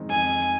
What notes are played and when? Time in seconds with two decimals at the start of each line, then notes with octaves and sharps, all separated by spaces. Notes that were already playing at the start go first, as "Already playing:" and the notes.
Already playing: F2 D#3 G#3 C4 D#4
0.10 F2 G#5